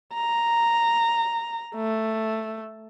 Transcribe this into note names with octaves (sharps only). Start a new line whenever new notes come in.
A#5
A3